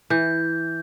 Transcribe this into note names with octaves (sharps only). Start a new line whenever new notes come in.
E3 G6